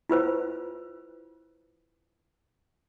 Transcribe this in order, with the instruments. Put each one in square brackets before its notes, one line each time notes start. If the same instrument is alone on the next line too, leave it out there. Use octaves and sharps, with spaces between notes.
[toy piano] E4 F4 B4 C5